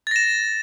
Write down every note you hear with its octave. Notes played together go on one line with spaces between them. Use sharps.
A6 A#6 E7